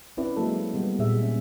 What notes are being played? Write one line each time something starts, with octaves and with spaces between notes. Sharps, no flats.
C4 C#4 E4 B4 D5
F#3 G#3 A#3 A4
G3 B3
A#2 G#4 E5
C#4